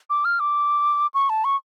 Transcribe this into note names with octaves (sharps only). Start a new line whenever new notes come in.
D6
F6
D6
C#6
A5
C#6